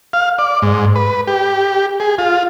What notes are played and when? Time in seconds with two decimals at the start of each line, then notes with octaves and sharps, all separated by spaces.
0.13 F5
0.39 D5
0.62 G#2
0.95 B4
1.27 G4
2.00 G#4
2.18 F4